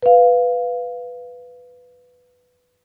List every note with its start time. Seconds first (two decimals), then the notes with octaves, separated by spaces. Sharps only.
0.03 B4 F5